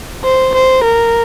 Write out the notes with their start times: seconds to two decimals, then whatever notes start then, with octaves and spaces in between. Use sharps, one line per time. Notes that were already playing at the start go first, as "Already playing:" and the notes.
0.25 C5
0.55 C5
0.84 A#4